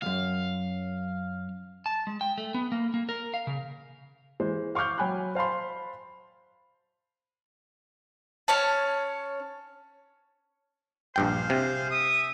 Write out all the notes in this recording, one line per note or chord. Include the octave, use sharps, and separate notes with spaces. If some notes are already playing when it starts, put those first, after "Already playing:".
C#2 F#2 F5
A5
G#3
G5
A3
B3
A#3
A#3
A#4
F5
C#3
E3 G#3 C5
F5 C#6 D6 F6 G6
F#3 G5 G#5 B5 F#6
C5 F5 A5 B5 C6
C#4 C#5 A5
A#1 G2 G#4 C5 F5 G5
C3
E5 D#6